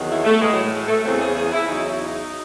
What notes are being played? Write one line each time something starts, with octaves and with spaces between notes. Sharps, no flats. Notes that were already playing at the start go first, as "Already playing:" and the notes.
Already playing: E2 C3 D#3 F#3
E4
A3
A2 E3 G#3
F#3
G#3
G#3
A3
E2 C#3 E3 C4
G#4
G#4
E4
E2 C#3 F#3 D#4
E4
D#4